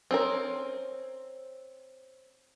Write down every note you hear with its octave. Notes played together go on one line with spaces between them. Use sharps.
C4 C#4 A#4